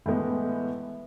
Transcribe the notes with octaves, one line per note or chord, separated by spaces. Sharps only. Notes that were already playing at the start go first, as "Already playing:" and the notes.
A2 E3 G#3 B3